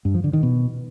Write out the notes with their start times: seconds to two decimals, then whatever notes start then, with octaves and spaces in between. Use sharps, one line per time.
0.05 G2
0.14 F3
0.24 D3
0.33 D#3
0.43 B2